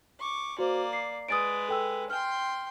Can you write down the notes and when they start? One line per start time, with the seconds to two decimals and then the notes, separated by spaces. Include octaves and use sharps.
0.19 C#6 D6
0.59 A#3 F#4 C5 D5
0.93 C7
1.28 G#3 B4 D#6 A6 D7
1.69 A4 G5 E6
2.10 G5 C6 F6